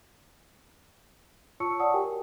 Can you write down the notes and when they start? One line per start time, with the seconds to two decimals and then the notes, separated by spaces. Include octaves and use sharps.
1.60 F4 C#5 A5 C#6 E6 C#7
1.80 D5 F#5 A5 D#6
1.93 F#4 G4 A#4 G5 G#5